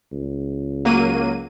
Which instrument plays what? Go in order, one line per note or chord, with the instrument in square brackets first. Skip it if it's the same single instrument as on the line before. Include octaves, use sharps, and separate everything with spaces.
[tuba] C#2
[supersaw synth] F#3 A#3 D#7